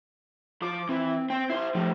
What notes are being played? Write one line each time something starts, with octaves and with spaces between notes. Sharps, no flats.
F3 D6
E3 C4
C4 G5
E4 C5 C6
A2 F3 G3